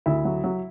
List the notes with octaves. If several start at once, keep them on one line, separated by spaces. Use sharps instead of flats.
D2 E4
F#3
F#3